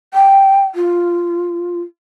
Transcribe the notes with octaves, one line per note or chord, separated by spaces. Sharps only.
G5
F4